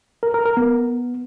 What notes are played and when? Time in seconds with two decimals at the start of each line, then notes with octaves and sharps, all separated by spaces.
0.23 A#4
0.34 A#4
0.46 A#4
0.57 B3